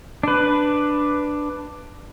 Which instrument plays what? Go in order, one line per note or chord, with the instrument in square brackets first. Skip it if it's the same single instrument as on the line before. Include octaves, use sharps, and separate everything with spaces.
[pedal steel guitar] D4 B4